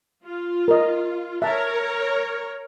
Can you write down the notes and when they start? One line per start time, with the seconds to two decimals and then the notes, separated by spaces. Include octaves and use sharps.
0.25 F4
0.68 A#4 D#5
1.42 A#4 C#5 E5 A5